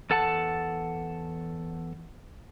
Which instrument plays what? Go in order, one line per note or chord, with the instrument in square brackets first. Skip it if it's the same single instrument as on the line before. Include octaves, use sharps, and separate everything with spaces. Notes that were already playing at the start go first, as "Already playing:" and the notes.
[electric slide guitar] E2 A4 F#5 A5